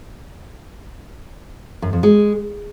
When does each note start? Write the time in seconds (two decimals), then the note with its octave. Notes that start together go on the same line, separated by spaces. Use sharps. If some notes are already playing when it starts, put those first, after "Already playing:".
1.82 F#2
1.93 F2
2.03 G#3